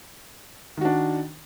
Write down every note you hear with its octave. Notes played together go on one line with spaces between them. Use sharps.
D#3 D4 F#4